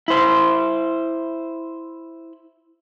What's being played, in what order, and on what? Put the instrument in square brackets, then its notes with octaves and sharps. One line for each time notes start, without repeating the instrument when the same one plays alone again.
[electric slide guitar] E4 C5